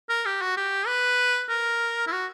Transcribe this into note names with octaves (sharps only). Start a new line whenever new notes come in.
A#4
G4
F#4
G4
B4
A#4
E4
F#4